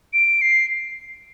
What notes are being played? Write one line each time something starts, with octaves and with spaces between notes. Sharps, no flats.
D7
C7